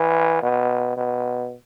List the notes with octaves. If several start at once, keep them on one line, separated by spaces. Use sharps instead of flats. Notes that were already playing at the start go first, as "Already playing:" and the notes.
Already playing: E3
B2
B2